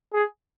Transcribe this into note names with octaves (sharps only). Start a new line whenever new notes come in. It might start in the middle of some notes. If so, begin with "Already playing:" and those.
G#4